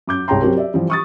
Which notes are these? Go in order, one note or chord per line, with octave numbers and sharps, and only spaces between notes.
F#2 D6 G6
C2 G#3 C#5 G5 A#5 C6
F#3 C4 F#4 G4 A#4
D5 E5
E3 F3 G3
C#6 D#6 A6